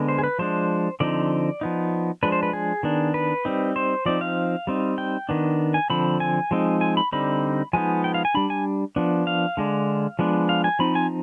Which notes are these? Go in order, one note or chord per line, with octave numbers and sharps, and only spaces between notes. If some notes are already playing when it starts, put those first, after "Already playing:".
Already playing: D3 G#3 B3
C5
G#4
B4
F3 G#3 D4 C5
D3 F3 C4 D#4 D5
F3 B3 D#4
F3 G#3 D4 B4
C5
B4
G#4
D#3 B3 D4
B4
G3 C4 D#4
C5
F3 C4 D#4 D5
F5
G3 C4 D#4
G5
D#3 B3 D4
G#5
D3 F3 C4 B5
G#5
F3 G#3 C4 D#4
G#5
B5
D3 G3 C4 D#4 B5
F3 G#3 B3 D#4 G#5
G5
F5
G#5
G3 D4 B5
G#5
F3 B3 D4
F5
D3 G#3 D4
F3 G#3 B3 D4
F5
G#5
F3 C4 D#4 B5
G#5